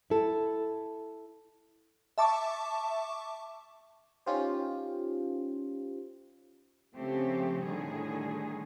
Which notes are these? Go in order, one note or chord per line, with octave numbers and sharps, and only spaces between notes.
E4 A4
E5 A5 C#6 D6
C#4 D#4 F4 G4 C5
C#3 F3 A3 C4 G4
A2 D3 D#3 G3 G#4